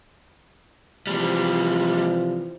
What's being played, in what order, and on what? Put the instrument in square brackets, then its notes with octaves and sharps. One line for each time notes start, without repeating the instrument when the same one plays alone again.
[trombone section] C3 E3 F3 [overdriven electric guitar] G3 G#3